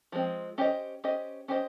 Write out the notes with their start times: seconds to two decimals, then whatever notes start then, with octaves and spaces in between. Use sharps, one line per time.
0.12 F3 G#3 C4
0.58 C#4 G4 C5 D#5
1.04 C#4 G4 C5 D#5
1.48 C#4 G4 C5 D#5